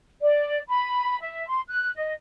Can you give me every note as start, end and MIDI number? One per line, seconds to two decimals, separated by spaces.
0.21 0.59 74
0.68 1.16 83
1.21 1.45 76
1.47 1.60 84
1.68 1.90 90
1.96 2.13 75